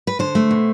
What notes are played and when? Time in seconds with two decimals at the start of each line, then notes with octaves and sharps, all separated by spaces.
0.07 B4
0.19 D3 C5
0.35 A3
0.51 B2